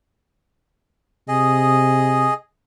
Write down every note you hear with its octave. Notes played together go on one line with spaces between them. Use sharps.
C3 G#4 D#5